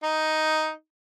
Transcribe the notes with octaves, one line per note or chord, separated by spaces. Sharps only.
D#4